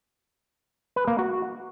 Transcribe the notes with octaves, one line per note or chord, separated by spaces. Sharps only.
B4
A#3
F#4